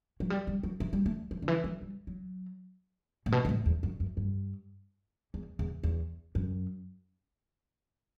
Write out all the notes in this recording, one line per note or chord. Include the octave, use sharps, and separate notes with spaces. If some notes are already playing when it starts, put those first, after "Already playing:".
F#3
G3
G3
F#3
E3
G3
A3
E3
D3
E3
F#3
G3
F#3
A2
B2
B2
A2
E2
F#2
F#2
G2
E2
E2
E2
F#2